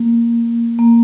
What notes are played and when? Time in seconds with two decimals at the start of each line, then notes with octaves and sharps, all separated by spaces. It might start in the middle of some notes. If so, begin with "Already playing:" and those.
Already playing: A#3
0.79 A#3